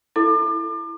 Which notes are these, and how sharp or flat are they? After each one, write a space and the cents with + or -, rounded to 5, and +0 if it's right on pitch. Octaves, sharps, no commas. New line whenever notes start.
E4 +10 A4 +0 D6 +35